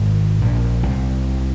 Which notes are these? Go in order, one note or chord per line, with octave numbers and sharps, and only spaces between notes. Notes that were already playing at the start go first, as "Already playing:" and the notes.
Already playing: G#1 G#2
A#1 A#2
C2 C3